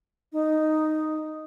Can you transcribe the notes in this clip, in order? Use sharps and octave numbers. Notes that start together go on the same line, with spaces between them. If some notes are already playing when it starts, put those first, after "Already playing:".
D#4